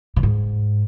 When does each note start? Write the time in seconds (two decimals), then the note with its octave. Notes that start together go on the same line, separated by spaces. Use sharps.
0.16 B2
0.23 G#2